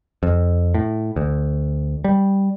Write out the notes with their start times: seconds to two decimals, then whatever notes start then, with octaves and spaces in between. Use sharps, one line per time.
0.23 F2
0.74 A2
1.16 D2
2.04 G3